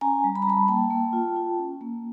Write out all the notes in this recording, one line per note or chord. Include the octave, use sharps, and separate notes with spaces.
C#4 G#5 A#5
G3
B5
A#5
G3 A5 B5
A#3 G5 A5
A#3
F4
F4
C#4
A#3